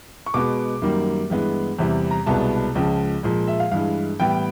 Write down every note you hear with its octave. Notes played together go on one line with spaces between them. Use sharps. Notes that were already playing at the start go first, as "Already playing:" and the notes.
C#6
B2 G#3 B3 D6
F#2 D#3 G3 A#3
G2 E3 G#3 B3
E2 C3 E3 G3
A#5
C2 B2 G#3 B3 A5
C#2 C#3 F3 G#3
A#2 F3 G#3
E5
F5
G2 E3 G#3 F5
A2 E3 G3 B3 G5